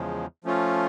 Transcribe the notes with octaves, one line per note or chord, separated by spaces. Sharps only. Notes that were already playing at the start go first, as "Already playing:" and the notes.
Already playing: E2 C#3 F3 G#3
F3 A3 C#4 F4